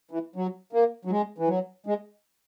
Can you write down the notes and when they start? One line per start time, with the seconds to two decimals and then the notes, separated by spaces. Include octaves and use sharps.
0.11 E3
0.36 F#3
0.73 A#3
1.05 F#3
1.10 G#3
1.38 E3
1.48 F#3
1.86 G#3